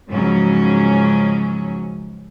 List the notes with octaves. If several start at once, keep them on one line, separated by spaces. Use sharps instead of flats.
G#2 C#3 F3 F#3 C#4